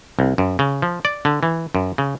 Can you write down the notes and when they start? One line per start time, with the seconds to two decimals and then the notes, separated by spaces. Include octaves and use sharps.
0.19 C2
0.38 F#2
0.59 C#3
0.82 F3
1.05 D5
1.25 D3
1.43 E3
1.75 F#2
1.98 C#3